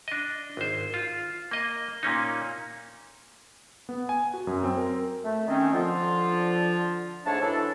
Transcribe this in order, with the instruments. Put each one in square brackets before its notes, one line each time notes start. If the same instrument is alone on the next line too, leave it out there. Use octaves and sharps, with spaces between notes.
[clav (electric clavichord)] D4 D#5
G#1 C5
F4
A#3 D#5
A#2 A#3 C#4 D#4
[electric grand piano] B3
G#5
F#4
F#2
C4
A#4
[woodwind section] A3
D#3 C4 C#4
D3 F3 F4
G#2 A3 D4 C#5 A5
E3 F#3 D4 A4